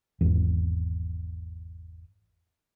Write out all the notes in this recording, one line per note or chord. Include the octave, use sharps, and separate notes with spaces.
G#1 E2